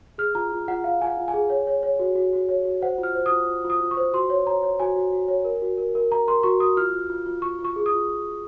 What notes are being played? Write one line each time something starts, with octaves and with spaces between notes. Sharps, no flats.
G#4 F6
F4 A#5
F4
F4 F#5
F4 F5
F4 G#5
F#5
F4
G#5
G#4
C#5
C#5
C#5
F#4
F#4
F#4
C#5
F#4
C5 F#5
F4
F6
C5
D#6
F4
F4
F4
D#6
F4
C#6
C5
F#4 C6
C#5
C#5 A#5
C#5
F#4 G#5
F#4
F#4
C#5
A#4
F#4
A#4
A#4
A#4 A#5
A#4 C6
F#4 C#6
F#4 D#6
F4 F6
F4
F4
F4
F4 C#6
F4
C#6
G#4
D#6
F4